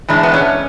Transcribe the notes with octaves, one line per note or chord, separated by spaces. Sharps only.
A2 E3 G#3 D4
B3
C#4